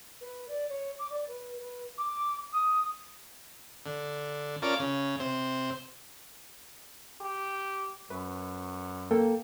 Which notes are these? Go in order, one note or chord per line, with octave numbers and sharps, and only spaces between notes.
B4
D5
C#5
D6
D5
B4
B4
D6
D#6
D3
C#4 F4 A#4 D5 A5
C#3
C3 C5
G4
F#2 B4
A#3 A4 G5